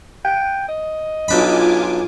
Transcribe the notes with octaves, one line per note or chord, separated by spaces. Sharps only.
G5
D#5
B1 D4 F4 G#5 B5 D6